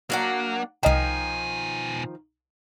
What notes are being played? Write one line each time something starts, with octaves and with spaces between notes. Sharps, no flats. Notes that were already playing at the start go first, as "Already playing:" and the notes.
F#3 A#3 D4 F#5
C2 B2 D#3 F3 D#5 G5 G#5